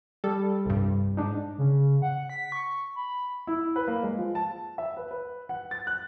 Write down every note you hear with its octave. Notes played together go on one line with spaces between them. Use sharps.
G3 A4
C2 G2
G#2 D4 D#4
C#3
F#5
B6
C#6
B5
E4
B4
A#3
G#3
F3
A5
E5
B4
B4
F#5
A6
F#6